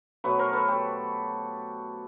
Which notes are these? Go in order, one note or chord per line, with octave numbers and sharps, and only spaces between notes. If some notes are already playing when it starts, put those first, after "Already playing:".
B2 F#3 A3 B4 C#5
A#4 C5
A4 B4
G4 A4